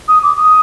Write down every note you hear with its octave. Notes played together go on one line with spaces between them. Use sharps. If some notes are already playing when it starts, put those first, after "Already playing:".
D#6
D6
D#6